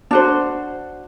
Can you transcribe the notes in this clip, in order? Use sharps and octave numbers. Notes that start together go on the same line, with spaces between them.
D4 F#4 C5